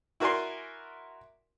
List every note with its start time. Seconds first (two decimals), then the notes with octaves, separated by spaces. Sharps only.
0.20 E4 F#4 A#4 D5 G#5 C6